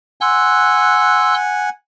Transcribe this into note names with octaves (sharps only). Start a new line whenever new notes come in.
F#5 G#5 C6 E6 F#6